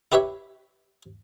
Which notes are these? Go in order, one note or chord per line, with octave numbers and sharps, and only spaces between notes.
E4 G4 B4 C#5 E5